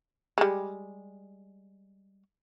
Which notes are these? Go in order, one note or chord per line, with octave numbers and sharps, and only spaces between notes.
G3 G#3